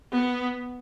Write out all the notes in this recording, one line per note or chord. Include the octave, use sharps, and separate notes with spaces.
B3